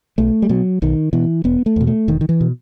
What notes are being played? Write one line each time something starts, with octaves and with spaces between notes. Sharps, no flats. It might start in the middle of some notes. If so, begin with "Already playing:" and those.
B1 A3
G3
B2 F#3
B1 D#3
B2 E3
E1 B3
A3
E2 B2
A3
E1 D#3
D#3
E3
B2